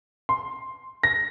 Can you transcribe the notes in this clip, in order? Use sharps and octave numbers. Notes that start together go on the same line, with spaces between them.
C6
A#6